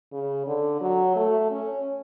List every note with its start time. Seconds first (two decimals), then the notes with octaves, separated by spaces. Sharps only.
0.12 C#3
0.47 D3
0.81 F#3
1.16 A3
1.51 C#4